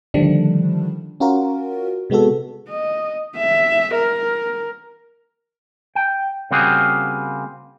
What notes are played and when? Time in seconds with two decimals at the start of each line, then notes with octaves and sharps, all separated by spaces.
0.14 D3 D#3 F3 G3 A3 D4
1.20 C#4 F4 F#4 A#4
2.10 C3 G#3 B3 F#4 A4
2.69 D#5
3.37 E5
3.95 A#4
5.95 G5
6.51 C#3 G3 A#3 C4 F#4 G#4